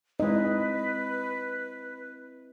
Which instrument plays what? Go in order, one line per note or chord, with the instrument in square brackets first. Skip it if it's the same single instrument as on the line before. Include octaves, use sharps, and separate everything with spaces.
[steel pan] G#3 D#4 [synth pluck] C4 E4 [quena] B4 [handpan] D#5